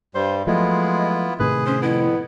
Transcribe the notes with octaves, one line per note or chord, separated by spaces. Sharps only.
G2 G3 C5
F3 F#3 G#3 A3 B3 E4 F4
A2 C3 D#3 G#4 B4
C#4 C5
F2 B3 E4